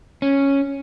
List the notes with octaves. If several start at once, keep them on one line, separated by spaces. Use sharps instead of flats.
C#4